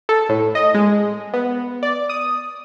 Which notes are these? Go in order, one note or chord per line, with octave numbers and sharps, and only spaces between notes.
A4
A2
D#5
G#3
B3
D5
D#6